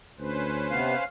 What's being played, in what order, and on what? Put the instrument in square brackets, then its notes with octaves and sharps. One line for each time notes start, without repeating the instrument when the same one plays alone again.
[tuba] D2 [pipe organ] C#4 B4 C5
[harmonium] C3 B3 [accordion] F5